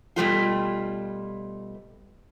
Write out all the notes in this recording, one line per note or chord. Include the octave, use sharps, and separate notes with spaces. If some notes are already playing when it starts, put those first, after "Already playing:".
B2 G3 A3 F4